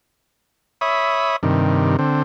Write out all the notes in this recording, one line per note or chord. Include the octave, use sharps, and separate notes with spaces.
C#5 E5 B5 D#6
G2 C3 D#3
D3 C4